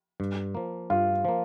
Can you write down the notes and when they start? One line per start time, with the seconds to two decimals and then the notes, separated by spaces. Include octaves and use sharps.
0.20 G2
0.55 F3 A#3
0.90 G2 F4
1.25 F3 A#3